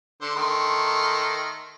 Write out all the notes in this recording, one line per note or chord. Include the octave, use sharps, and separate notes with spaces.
D3 C5
D#3 A3 C6